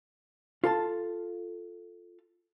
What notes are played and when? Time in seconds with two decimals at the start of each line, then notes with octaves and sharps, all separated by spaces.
0.64 F4 A4 A5